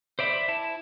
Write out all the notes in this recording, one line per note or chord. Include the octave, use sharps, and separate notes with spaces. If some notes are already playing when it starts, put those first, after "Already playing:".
C5 D5 E5 B5
E4 A5